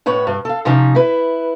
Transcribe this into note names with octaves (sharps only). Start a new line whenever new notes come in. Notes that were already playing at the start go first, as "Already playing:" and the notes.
A2 B4 C#5 F#5
G2
A4 F5
C3 F3 C#4 D#4
E4 B4